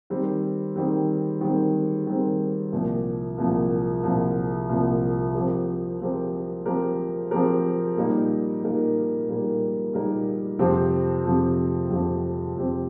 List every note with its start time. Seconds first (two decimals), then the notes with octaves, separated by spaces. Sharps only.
0.10 D#3 G3 C4
0.76 D#3 G3 C4
1.41 D#3 G3 C4
2.07 D#3 G3 C4
2.72 C2 A#2 F3
3.38 C2 A#2 F3
4.03 C2 A#2 F3
4.69 C2 A#2 F3
5.35 F3 C4 G4 A#4
6.00 F3 C4 G4 A#4
6.66 F3 C4 G4 A#4
7.31 F3 C4 G4 A#4
7.97 A#2 G3 A#3 D#4 A#4
8.63 A#2 G3 A#3 D#4 A#4
9.28 A#2 G3 A#3 D#4 A#4
9.93 A#2 G3 A#3 D#4 A#4
10.59 F2 C3 F3 C4 G4
11.25 F2 C3 F3 C4 G4
11.90 F2 C3 F3 C4 G4
12.56 F2 C3 F3 C4 G4